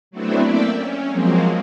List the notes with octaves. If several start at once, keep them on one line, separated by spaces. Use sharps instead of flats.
F#3 A3 B3 C4 D4 E4
A#3 D5 E5 G5
C#4
F3 F#3 G#3 A#3 C4